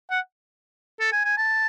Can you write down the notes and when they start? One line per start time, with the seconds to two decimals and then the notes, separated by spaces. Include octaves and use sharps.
0.10 F#5
1.00 A4
1.12 G#5
1.25 G#5
1.38 A5